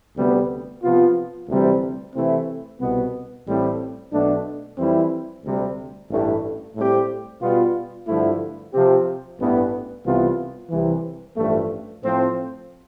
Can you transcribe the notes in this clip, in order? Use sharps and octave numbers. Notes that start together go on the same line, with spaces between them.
D2 C3 G3 B3
C3 F3 B3 F4
D2 C3 E3 G3 C4
C3 E3 A3 C4 E4
C2 B2 B3
A1 A2 G3 C4
B1 B2 A3 D4
F2 E3 G3 C4 E4
D2 C3 G3
A1 G2 E3 A3
A2 G3 C4 G4
B2 G3 B3 F4
G2 D3 F3 A3 E4
C3 F3 C4 G4
A1 G2 E3 B3
C2 C3 E3 B3 F4
C2 C3 E3
A1 G2 F3 A3
A2 F3 C4